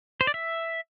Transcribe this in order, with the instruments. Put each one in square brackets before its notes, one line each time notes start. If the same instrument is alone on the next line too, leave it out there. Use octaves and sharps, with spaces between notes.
[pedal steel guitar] C5
D5
E5